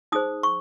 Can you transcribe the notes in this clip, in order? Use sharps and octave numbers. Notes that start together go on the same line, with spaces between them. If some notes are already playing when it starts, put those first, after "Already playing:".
D#4 G#4 C5 D#6
C#6